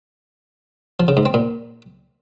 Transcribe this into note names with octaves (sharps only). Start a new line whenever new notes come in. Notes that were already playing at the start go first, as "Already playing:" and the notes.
F3
C#3
G#2
C4
A#2